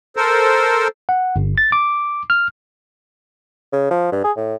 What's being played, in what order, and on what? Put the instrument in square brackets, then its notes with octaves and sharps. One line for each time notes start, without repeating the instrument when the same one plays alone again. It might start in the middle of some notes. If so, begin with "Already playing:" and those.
[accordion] A4 A#4 C5
[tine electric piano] F#5
G1
A6
D6
F6
[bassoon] C#3
F3
G2
G#4
A2